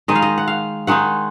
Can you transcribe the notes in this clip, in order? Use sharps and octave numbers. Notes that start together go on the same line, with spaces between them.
D#3 G#3 D#4 D#5
F5
D#5
F#5
F5
D#3 G#3 D#4 F#5